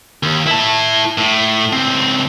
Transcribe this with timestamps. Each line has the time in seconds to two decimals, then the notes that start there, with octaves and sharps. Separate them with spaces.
0.23 D#2
0.47 E4 A5
1.18 A2
1.73 C#2 C4